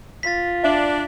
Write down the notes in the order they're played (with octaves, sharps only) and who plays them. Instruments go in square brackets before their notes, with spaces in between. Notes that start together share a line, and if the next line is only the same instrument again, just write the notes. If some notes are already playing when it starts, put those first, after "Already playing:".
[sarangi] F4 [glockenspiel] A6 B6
[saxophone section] D4 [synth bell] E5